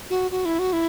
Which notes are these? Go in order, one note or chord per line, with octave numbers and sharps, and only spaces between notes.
F#4
F#4
E4
F#4
E4